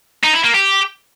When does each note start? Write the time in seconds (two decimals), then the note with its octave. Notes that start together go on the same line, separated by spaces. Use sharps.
0.23 D#4
0.33 E4
0.44 A#3
0.54 G4